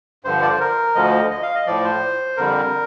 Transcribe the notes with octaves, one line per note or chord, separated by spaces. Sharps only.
G2 D3 F3 C5
D5
C5
A#4
D2 D3 F3 D#5
D#5
F5
D#5
A2 F3 D5
C5
F2 D3 G3 A#4